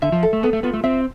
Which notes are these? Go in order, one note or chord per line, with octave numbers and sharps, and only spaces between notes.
D3 E5
F3
A4
A3
B3 A4
A3
B3 F4
A3
C4 E5